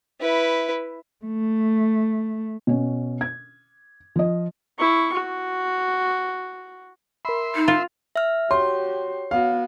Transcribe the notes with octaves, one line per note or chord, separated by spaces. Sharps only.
E4 B4
A3
B2 C#4
G#6
F3 D#5
E4 C#6
F#4
A#4 E5 B5 C6
D#4
F4
E5 F6
F#4 G4 C#5 C6
B3 F#4 F5